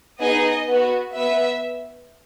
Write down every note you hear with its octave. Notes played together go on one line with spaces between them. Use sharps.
B3 D#4 G#4 D#5
B3 F#4
B3 E5